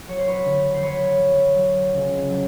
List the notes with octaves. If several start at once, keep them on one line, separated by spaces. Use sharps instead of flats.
F#3 C#5
C5
B4 C#5
D3
C5
F#3 B4 C#5
F#3
F#3
C#2
F#3